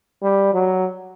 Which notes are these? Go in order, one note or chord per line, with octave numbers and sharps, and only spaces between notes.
G3
F#3